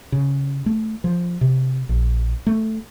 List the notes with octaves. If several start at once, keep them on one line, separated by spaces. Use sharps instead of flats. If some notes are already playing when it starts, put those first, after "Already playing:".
C#3
A3
F3
C3
A#1
A3